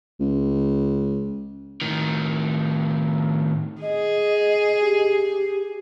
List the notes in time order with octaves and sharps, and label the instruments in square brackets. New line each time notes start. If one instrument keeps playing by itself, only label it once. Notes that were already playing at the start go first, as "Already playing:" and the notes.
[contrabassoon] C#2
[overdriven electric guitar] A2 D#3
[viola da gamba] G#4 [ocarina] D#5
[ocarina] G4